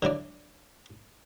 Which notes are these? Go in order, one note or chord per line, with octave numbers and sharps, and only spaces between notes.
D3 F#3 E4 D5